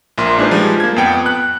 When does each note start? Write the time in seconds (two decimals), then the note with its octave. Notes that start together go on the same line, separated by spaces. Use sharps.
0.18 A#1 A#3 F4 C6
0.38 G#3 D4 D#4 G#4 B4 C5
0.51 F3 G3 G#3
0.80 A#3 G#6
0.96 F2 B3 G5 C#7
1.26 F#6